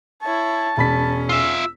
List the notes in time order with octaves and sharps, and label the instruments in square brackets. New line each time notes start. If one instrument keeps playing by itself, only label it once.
[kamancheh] E4 C#5 [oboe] A5
[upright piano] E1 B5 B6 [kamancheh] C#4
[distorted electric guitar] F4 E5 [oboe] E6